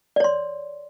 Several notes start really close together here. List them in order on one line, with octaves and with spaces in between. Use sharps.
D5 C#5 C6